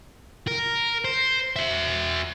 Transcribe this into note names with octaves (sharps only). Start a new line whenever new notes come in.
A#4
C5
F#4 E5